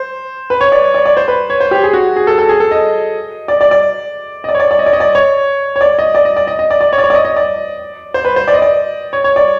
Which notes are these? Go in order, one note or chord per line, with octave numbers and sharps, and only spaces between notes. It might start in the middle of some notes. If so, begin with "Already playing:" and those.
Already playing: C5
B4
C#5
D5
D5
D5
C5
B4
C#5
C5
G4
G#4
F#4
G#4
A4
A4
G#4
A4
D#5
D5
D5
D5
D#5
D5
C#5
D5
D5
D#5
D5
D#5
D5
C#5
C#5
D5
D#5
D5
D#5
D5
D#5
D#5
D5
D5
C#5
D5
C#5
D5
D#5
D#5
D5
C5
B4
C5
D5
D#5
D5
C#5
C#5
D5